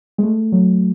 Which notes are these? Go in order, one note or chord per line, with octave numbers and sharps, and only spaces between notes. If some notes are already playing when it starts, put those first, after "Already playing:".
G#3
A3
F#3